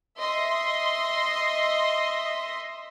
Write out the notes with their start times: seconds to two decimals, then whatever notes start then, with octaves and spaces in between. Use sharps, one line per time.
0.18 D#5 E5 C6